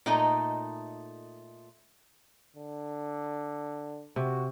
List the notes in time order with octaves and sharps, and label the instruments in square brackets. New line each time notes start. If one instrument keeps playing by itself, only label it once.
[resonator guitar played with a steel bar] A#2 A3 D#4 D#5 A#5
[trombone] D3
[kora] C3 [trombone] F#4